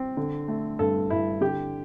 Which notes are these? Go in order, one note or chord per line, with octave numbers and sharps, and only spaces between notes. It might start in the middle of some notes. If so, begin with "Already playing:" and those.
Already playing: C4
D3
A3
G2 A4
G2 E4
D3 G4